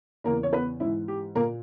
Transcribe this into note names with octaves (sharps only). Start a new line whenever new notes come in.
E2 C#3 E3 A#3 A#4
C#5
B3 B4
G#2 E3 E4
G4
A#2 A#3 A#4